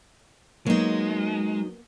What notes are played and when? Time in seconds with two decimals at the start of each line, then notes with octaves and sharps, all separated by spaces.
0.66 F#3 G#3 A#3 B3 D#4